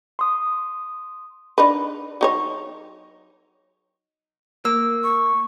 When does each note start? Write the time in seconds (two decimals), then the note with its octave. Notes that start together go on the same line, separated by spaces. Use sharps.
0.19 C6 D#6
1.58 D4 D#4 B4
2.21 F#3 D#4 C#5
4.65 A#3 E6
5.04 C#6